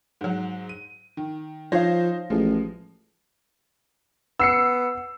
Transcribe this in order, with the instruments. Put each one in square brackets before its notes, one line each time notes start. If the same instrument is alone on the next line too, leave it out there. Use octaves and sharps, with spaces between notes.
[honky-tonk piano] G#2 F#3
D#7
D#3
[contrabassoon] F3 [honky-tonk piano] D#4 C5 A#6 [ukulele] C#5 F5
[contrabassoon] A1 [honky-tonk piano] F3 G#3
[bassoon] B3 [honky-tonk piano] E6 C7 C#7